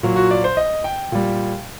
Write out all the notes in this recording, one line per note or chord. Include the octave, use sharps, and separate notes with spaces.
A#2 F#3
F#4
D5
C5
D#5
G5
A#2 G3